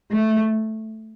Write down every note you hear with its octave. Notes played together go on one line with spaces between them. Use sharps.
A3